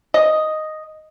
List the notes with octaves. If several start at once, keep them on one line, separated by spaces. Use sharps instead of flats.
D#5